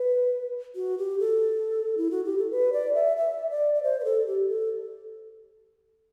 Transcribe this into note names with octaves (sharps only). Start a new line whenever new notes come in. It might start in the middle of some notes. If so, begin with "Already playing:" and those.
Already playing: B4
F#4
G4
A4
E4
F#4
G4
A4
B4
D5
E5
E5
D5
D5
C5
B4
A4
G4
A4